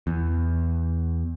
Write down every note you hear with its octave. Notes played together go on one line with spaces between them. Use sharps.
E2